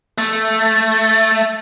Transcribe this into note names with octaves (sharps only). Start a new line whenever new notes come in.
A3